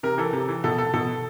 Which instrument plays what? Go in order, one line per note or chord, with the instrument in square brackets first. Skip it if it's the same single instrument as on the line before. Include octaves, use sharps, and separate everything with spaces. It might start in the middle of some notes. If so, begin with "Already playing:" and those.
[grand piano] C3 A#4
E3 A4
C3
E3
B2 A4
A4
B2 A4